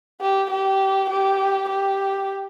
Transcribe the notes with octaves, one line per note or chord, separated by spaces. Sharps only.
G4
G4
G4
G4